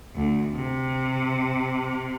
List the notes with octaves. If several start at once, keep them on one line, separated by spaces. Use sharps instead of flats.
D2
C3